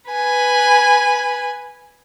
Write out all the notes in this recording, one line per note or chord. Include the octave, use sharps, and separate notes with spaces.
B4 G#5